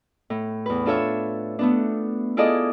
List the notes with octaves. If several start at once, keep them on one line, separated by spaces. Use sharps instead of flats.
A2
E2 B4
D4 F4 A4 C#5 E5
A3 B3 D4
E4 F4 G#4 A4 D5 D#5